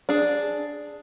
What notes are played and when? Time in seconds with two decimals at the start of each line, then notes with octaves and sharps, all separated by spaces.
0.09 D4 G#4